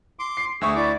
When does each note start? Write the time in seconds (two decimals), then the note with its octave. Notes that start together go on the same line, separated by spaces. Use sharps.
0.19 C6 D6
0.37 C7
0.61 D2 G#4 E5 C#6 E6
0.75 E4 D5 D6